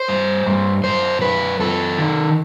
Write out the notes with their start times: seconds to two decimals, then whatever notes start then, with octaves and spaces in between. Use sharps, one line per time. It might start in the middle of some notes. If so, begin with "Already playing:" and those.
Already playing: C5
0.08 G2
0.46 G2
0.84 F#2 C5
1.22 F#2 B4
1.59 F#2 A4
1.98 D#3